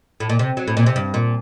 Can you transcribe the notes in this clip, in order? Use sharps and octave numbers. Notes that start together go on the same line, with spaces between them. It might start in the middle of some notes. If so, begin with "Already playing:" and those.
A2
A#2
C3
F#3
A2
A#2
C3
G2
A#2